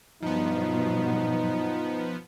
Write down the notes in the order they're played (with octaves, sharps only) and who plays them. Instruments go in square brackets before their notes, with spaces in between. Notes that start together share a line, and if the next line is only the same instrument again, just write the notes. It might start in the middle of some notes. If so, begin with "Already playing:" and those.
[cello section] G2 B2 F#3 [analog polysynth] F3 B3 [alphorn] D#4